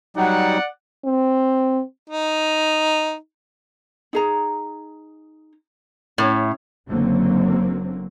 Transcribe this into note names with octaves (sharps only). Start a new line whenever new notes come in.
F#3 G3 D#4 D5 F#5
C4
D#4
D#4 G#4 A#5
A2 C#4 E4 C#5
F#1 D3 F#3 A#3 C4